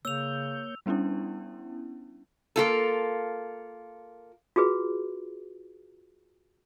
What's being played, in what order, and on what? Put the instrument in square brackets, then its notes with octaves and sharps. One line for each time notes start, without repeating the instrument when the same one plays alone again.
[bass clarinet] C#3 [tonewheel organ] A#3 C#5 G6 [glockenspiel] E6 F7
[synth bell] G3 B3 C#4 D4 E4
[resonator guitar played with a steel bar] A#3 F4 A4
[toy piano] F4 F#4 G#4 B4